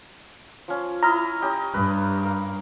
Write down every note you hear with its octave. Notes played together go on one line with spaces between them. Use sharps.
F3 C#4
E4 D#5 A#5 F6
C#4 G4 D#5
G2 B4
A#4 F5